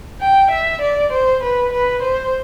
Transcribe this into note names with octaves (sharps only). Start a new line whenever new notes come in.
G5
E5
D5
C5
B4
B4
C5